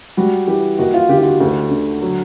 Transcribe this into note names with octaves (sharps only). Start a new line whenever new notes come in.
G3 F#4
E3 G4
D#2 F#4
F4
D3 G4
F4
F#4
D2
D3
F#3